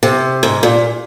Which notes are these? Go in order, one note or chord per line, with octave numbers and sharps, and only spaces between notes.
C3
G#2
A#2